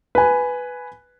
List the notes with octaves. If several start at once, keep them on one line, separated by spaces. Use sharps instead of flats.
B4 G#5